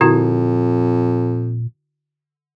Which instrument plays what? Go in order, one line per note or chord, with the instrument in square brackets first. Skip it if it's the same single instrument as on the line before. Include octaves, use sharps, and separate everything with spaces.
[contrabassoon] F2 [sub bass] A#2 [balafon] D3 E4 F#4